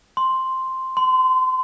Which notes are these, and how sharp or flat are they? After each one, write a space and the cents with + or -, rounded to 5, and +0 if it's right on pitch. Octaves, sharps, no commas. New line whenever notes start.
C6 +0
C6 -30